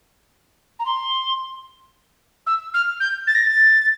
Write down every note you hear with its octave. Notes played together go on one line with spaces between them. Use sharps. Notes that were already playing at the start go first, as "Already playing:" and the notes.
A#5
C6
E6
F6
G6
A6
A#6
A6